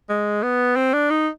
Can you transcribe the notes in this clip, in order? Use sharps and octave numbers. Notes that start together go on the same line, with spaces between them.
G#3
B3
C4
D4
D#4